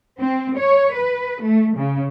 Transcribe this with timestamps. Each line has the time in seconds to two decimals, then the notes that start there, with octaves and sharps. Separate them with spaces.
0.18 C4
0.57 C#5
0.95 B4
1.43 A3
1.76 C#3